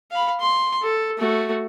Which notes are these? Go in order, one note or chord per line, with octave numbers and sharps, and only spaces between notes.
F5 B5
C6
A4
A3 F#4